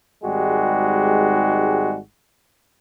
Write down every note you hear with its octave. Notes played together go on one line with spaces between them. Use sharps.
G#1 G#2 G3 G#3 F#4 G4